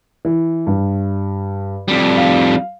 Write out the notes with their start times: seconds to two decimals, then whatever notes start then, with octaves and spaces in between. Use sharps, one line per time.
0.25 E3
0.67 G2
1.88 F2 G3
2.18 F5